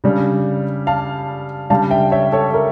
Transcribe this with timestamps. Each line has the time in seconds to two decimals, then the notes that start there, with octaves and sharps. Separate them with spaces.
0.04 C#3 G3 D4
0.87 F5 A5
1.70 C#3 G3 D4 F5 A5
1.90 E5 G5
2.12 C#5 E5
2.32 A4 C#5
2.54 A#4